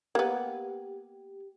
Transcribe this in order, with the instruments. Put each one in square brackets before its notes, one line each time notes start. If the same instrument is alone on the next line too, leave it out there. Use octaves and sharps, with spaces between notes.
[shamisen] A#3 B3 [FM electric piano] G4